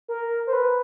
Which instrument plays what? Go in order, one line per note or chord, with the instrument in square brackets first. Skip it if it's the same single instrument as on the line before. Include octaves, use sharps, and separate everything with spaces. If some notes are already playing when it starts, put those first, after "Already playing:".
[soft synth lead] A#4
C5
B4